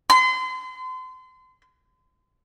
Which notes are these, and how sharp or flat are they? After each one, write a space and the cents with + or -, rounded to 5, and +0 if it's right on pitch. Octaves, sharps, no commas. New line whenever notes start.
C6 -35